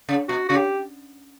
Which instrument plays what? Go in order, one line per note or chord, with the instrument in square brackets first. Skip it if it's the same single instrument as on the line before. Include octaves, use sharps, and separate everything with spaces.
[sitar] C#3
[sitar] B2 [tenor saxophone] F#4
[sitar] C#3 [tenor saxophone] F#4
[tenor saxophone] G4